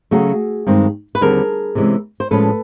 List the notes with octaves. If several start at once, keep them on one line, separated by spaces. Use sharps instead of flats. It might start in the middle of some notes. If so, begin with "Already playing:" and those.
C#3 F#3 A3 C#4 F#4 G#4
G2 D#3 G#3 C4
B4
D#2 D3 G3 C4 G#4 A#4
C3 E3 G#3 C#4
C5
A2 F3 G#3 C#4 A4 B4